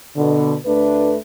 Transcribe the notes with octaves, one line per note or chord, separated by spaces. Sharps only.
B2 D3
D2 A3 D4 B4